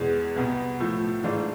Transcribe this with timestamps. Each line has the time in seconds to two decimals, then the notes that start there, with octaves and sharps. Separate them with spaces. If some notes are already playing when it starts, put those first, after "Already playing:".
Already playing: E2 B2 G#3
0.36 C2 B2 B3
0.80 A2 F3 A3 E4
1.24 G#2 E3 A3 D4 F4